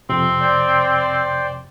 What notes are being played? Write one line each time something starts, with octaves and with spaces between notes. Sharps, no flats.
F2 C3 C4
C5 D5 G5